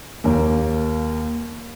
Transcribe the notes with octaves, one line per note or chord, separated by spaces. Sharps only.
D#2 A#3